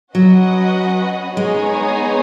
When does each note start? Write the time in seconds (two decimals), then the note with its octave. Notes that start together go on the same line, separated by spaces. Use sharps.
0.15 F#3 C#4 F#4 B4 D#5 F#5
1.37 G#3 B3 D#4 G#4 C#5